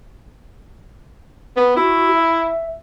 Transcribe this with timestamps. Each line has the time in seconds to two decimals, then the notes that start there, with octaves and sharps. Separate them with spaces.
1.57 B3
1.76 E4 F#4
2.15 E5